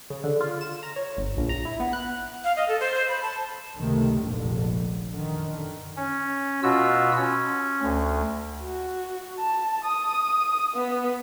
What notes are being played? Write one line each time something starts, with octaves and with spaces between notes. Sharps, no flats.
C#3
D3
F4
E7
A#5
C#5
G1
A#1
A#5
E4
B3
F#6
F5
D#5
A4
C5
C5
B5
A5
C#2 F#2 C3 D#3 A3
F1 A#1 F2 G#2 D3
F#2 D3 D#3
C#4
B2 F4 F#4 E6
C#4
D2
F#4
A5
D#6
B3